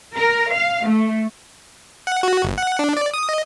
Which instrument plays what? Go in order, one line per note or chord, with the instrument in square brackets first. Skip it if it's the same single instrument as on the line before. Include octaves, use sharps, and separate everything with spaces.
[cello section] A#4
F5
A3
[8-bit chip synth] F#5
F#4
G1
F#5
D4
D5
D#6
D#5